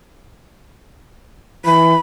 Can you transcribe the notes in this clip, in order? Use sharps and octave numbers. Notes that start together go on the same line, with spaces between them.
E3 B5